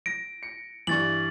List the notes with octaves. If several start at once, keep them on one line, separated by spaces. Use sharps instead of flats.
A#6 D7
C#7
G2 E3 C#6 A6 F#7